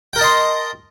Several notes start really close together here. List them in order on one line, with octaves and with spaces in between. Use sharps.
G5 A#4 A5 D#5 C6